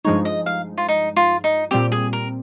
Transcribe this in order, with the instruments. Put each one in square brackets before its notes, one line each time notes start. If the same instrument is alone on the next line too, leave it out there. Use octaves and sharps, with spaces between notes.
[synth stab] G2 F3 G#3 D#4 [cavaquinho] C#5
[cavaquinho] D#5
F5
F4
D#4
F4
D#4
[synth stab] A#2 G3 C4 [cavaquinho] G4
[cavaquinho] G#4
A#4